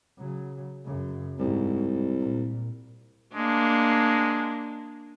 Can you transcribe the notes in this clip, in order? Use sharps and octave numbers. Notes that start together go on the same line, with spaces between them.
C#3 F#3
F#2 C#3
C2 G#2
A#2
G#3 A#3 D4